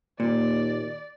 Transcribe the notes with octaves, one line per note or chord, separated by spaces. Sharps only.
D#2 A#2 D5